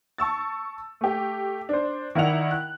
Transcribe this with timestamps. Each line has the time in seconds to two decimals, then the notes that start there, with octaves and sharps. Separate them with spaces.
0.18 A5 C#6 E6 A6
1.01 A3 G4
1.69 D4 C5
2.15 D#3 E4 A#4 D5 F#5 F7
2.51 F#6